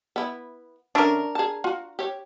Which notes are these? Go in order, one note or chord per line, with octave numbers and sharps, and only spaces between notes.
B3 E4
D3 C#4 D4 A#4 E5
G#4 A5
F4 F#4
G4 C#5